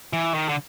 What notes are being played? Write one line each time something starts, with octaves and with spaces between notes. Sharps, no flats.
E3
D#3
D3